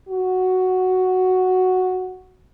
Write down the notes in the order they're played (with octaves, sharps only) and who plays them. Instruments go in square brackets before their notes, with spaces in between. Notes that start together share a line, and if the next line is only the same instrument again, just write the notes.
[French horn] F#4